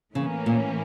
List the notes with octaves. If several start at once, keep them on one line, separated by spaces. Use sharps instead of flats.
A2 C#3 E3 A#3 C#4
A#2